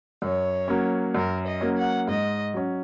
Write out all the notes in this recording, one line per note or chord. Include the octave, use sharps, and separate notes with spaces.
F#2 C#5
F#3 A#3 C#4
F#2 A#4
D#5
F#3 A#3 C#4
F#5
G#2 D#5
F#3 C#4